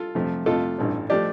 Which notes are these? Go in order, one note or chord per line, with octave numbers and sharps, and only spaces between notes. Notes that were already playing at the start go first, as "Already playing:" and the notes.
Already playing: F4 A4
F2 C3 F3 A3
F2 C3 A3 F4 A4
A1 G2 G3
F3 A3 D4 G4